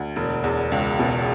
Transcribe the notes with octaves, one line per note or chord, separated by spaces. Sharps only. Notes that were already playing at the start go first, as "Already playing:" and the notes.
Already playing: D2
E1
E2
C#2
B2